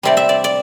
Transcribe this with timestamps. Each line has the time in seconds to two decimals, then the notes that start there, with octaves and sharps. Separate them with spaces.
0.03 C3 G3 C4 D5
0.17 E5
0.29 D5
0.44 D5